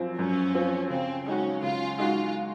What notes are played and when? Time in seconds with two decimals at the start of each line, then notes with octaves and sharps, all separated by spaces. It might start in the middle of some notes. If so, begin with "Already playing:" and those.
Already playing: F#2 F3 C4
0.19 F#2 C#4
0.55 F3 C4
0.90 C#3 C4
1.26 G#3 C#4 D#4 F#4
1.62 C#3 F4
1.98 G#3 D#4 F4 F#4